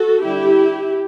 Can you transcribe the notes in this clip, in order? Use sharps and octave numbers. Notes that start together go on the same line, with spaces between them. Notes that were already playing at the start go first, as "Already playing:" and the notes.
Already playing: F#4 A4
D3 G3 D4 E4 G4